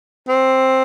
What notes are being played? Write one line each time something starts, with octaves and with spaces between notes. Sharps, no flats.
C4